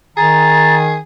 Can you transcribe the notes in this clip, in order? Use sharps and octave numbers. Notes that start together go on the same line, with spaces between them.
D#3 G#4 A#5 A6